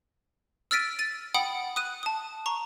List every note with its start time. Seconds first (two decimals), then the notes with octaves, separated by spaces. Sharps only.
0.71 E6 F6 A6 B6 D7 D#7
0.99 A6 D#7
1.34 F#5 G5 B5 D#6
1.76 D#6 F#6 D#7
2.03 A5 D#6
2.46 A#5 C#6